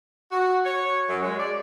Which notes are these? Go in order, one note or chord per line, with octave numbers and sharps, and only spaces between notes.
F#4
C#5
F#2
G#3
D5